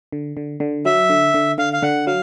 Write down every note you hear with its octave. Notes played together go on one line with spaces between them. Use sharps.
D3
D3
D3
F#3 E5
D3
D3
D3 F5
F5
D3 F#5
F#3 F5